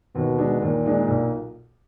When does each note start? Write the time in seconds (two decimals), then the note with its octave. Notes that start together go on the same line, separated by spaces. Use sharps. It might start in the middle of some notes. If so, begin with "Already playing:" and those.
0.15 D#2 B2
0.38 D#3 G#3 D4
0.62 D#2 A#2
0.85 D#3 G#3 D4
1.08 B1